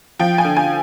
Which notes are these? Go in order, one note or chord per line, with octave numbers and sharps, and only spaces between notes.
F3 G5
G#5
D3
G#5